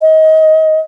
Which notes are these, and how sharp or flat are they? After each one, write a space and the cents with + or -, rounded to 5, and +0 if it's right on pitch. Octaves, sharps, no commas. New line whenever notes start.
D#5 +25